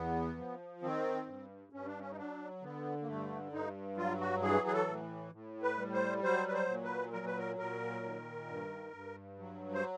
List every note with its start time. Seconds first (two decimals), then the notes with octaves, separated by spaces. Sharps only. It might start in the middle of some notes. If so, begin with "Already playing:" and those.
Already playing: E2 B3
0.37 F3
0.82 D#3 C4
1.27 G2
1.73 G2 C#4
1.86 D4
1.99 C#4
2.11 D#4
2.17 F#3 D4
2.62 D3 B3
3.02 A#3
3.07 G2 A3
3.52 G2 D#4
3.97 F#3 F4
4.20 F#4
4.43 E3 G#4
4.67 G#4
4.73 A4
4.88 A2
5.33 A2
5.62 B4
5.78 G3
5.93 C5
6.23 F#3 C5
6.47 B4
6.54 C5
6.68 A#2
6.84 B4
7.13 F#3 A#4
7.26 B4
7.38 A#4
7.58 A#2 A#4
8.03 D#3
8.48 G2
8.93 G2
9.39 F#3
9.74 C5